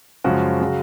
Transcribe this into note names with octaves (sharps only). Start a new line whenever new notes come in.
F#2 C#3 F3 G#3 F#4
C#3 F#3